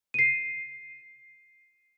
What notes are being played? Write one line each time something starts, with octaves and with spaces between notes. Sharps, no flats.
C7 D#7